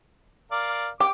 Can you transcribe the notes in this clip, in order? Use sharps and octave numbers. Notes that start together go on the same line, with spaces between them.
A#4 D5 F5
G4 D6